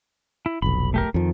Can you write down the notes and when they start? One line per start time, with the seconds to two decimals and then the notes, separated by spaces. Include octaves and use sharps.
0.46 E4
0.62 F1 B1 B5
0.94 A3 G4 A#4
1.14 F2 D#3 F3